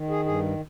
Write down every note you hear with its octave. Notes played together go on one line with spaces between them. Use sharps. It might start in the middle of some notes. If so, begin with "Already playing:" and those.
Already playing: D#3
G#4
G2 G#4